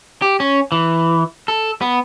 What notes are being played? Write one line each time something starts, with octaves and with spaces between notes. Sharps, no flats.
G4
C#4
E3
A4
B3